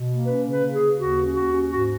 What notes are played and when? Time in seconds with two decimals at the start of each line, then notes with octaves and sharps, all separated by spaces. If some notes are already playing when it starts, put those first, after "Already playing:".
Already playing: B2
0.08 A#3
0.26 C#4 B4
0.44 C#3
0.50 B4
0.62 C#3
0.74 G#4
0.80 C#3
0.98 D#2 F#4
1.17 C#4
1.35 D#2 F#4
1.53 C#4
1.71 G#2 F#4